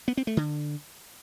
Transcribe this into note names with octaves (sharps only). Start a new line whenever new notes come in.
B3
C4
A3
D3